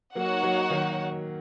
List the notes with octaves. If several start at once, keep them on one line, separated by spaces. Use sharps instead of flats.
F#3 A#3 D#4 F#4 C#5 F#5
F#3 A#3
D#3 F#3